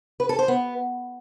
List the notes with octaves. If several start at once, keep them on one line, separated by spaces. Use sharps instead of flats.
B4
A4
C5
B3